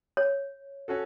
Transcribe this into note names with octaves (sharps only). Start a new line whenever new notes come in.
C#5
C#4 F#4 A4